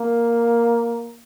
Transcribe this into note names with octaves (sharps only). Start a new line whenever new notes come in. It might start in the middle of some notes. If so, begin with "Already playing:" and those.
Already playing: A#3